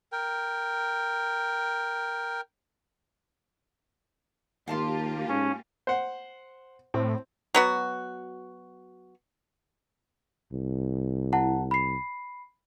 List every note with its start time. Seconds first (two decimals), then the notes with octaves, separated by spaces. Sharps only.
0.12 A#4 G5
4.68 D#2 A#3 F4 G4 F5 A5 C6
5.29 G#2 C#4
5.87 C5 F#5
6.94 A2 C4
7.54 F#3 B3 F#4
10.52 C2
11.33 E4 F#5 A5
11.71 B5 C7